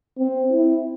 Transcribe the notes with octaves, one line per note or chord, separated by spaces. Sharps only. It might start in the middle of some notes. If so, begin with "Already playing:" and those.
C4
E4